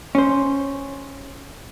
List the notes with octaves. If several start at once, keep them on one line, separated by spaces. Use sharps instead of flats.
C#4 C5